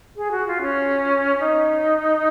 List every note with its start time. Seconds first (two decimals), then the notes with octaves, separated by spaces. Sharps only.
0.17 G#4
0.32 F#4
0.47 F4
0.61 C#4
1.39 D#4